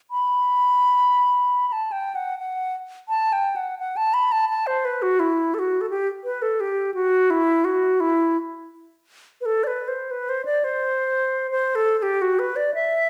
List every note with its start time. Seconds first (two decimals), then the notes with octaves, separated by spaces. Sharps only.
0.11 B5
1.68 B5
1.72 A5
1.92 G5
2.15 F#5
2.39 F#5
3.09 A5
3.33 G5
3.56 F#5
3.79 F#5
3.97 A5
4.14 B5
4.32 A5
4.49 A5
4.67 C5
4.85 B4
5.02 F#4
5.20 E4
5.54 A4
5.59 F#4
5.81 A4
5.90 G4
6.24 B4
6.42 A4
6.60 G4
6.94 F#4
7.30 E4
7.65 F#4
8.00 E4
9.41 B4
9.46 A4
9.64 D5
9.67 B4
9.88 C5
10.11 B4
10.29 C5
10.45 D5
10.64 C5
11.51 C5
11.75 A4
11.99 A4
12.02 G4
12.22 F#4
12.39 B4
12.56 D5
12.74 E5